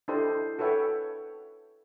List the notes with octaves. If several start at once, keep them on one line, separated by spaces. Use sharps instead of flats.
D4 E4 G4 A4 C5 D#5
F#4 A4 B4 C#5 E5 G5